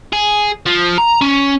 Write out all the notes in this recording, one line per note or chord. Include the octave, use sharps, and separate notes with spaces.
G#4
F3
A#5
C#4